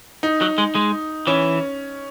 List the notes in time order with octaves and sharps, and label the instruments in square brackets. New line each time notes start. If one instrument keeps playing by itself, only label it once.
[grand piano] D#4
[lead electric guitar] F#3
G#3
G#3
[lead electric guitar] E3 [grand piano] C#4